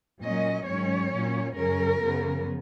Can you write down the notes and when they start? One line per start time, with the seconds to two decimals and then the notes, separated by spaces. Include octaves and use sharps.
0.23 A#2 F#3 C#4 D#5
0.67 G#2 D#3 F#3 C#4 C#5
1.12 A#2 F#3 C#4
1.56 F#2 C#3 F#3 C#4 A#4
2.00 F#2 C#3 F3 B3